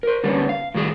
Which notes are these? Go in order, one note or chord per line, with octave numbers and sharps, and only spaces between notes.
A#4 C5
D3 G3 A#3 B3 C#4 D4
F5
A2 D#3 G3 G#4